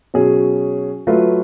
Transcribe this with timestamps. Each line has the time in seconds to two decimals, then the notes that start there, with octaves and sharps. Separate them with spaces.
0.14 B2 F#3 C#4 G#4
1.07 F#3 A3 F4 B4